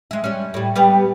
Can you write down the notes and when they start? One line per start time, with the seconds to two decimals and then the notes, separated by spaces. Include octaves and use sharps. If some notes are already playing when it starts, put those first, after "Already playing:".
0.11 G#3 E5
0.24 G3 C#4
0.54 A2 G3
0.76 G3 B3 G4